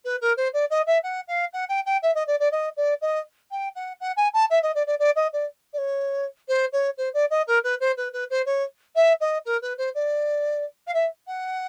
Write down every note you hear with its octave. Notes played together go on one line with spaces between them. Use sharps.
B4
A#4
C5
D5
D#5
E5
F#5
F5
F#5
G5
G5
E5
D#5
D5
D5
D#5
D5
D#5
G5
F#5
F#5
G#5
A5
E5
D#5
D5
D5
D5
D#5
D5
D5
C#5
C5
C#5
C5
D5
D#5
A#4
B4
C5
B4
B4
C5
C#5
E5
D#5
A#4
B4
C5
D5
F5
E5
F#5